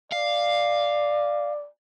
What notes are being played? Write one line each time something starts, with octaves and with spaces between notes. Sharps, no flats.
D5 F5